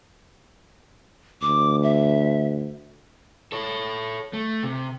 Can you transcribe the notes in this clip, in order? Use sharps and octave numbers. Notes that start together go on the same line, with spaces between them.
D2 D6
E5
A4 C#5
A3
C3